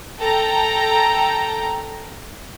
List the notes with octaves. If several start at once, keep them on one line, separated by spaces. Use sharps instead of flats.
A4 G5 A#5